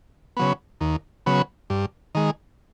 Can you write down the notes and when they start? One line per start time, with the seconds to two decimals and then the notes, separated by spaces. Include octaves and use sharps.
0.37 C#3 F#3 B3
0.81 D#2
1.26 C#3 F#3 B3
1.70 G2
2.15 D#3 G#3